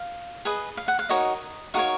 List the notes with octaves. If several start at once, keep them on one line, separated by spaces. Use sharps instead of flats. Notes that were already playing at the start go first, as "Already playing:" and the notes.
Already playing: F5
G#4 B4 D#5
F5
F#5
F5
D#4 F#4 A#4 C#5 D#5
D#4 F#4 A#4 C#5 F5